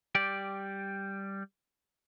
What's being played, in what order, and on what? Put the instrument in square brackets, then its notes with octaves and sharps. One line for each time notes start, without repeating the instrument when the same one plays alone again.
[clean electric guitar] G3 G4 D5